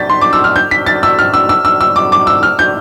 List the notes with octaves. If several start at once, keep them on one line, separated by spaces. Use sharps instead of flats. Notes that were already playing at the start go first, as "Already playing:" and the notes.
Already playing: G6 A6 B6
C6
D6
E6
F6
G6
B6
A6
E6
F6
E6
E6
E6
E6
D6
D6
E6
F6
G6